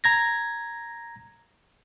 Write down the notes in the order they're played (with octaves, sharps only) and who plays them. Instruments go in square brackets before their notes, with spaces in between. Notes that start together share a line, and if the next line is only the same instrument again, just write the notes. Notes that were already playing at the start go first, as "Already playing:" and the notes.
[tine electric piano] A#5 G#6 A#6